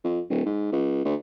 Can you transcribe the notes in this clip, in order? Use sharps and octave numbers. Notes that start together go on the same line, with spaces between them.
F2
D1
G#2
C#2
D2